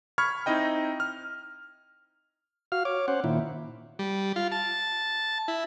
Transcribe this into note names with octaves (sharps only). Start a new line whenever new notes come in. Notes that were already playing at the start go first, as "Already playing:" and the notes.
B5 C#6 F6 G#6
C4 D#4 E4 D#5 G5
F6
F#4 F5 F6
C#5 D6
C#4 C5 F#5
A#2 D#3 E4
G3
F4
A5
E4